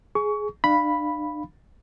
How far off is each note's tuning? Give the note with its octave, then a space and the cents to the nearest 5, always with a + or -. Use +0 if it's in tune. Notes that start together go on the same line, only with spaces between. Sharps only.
G#4 +10 C#6 +25
D4 +40 F5 -5 B5 +0